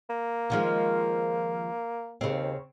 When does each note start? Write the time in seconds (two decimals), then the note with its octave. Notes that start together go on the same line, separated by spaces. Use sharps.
0.10 A#3
0.50 D#3 F3 G#3
2.21 D#2 C#3 C4